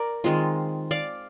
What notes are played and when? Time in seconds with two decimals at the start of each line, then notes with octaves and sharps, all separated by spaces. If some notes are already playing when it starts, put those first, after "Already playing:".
Already playing: A#4 D5
0.24 D#3 G#3 C4 F4
0.91 D5 F5